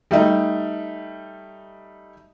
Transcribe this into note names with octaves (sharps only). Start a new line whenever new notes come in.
G3 A3 D#4